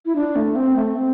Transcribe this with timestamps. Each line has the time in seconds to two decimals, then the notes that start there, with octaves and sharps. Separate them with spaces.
0.06 E4
0.15 D4
0.36 A3
0.56 C4
0.76 A3
0.96 C4